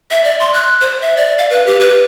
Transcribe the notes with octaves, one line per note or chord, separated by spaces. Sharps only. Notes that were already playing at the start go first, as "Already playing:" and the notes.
E5
D5
C6
F#6
C5
E5
D5
F5
B4
G4
B4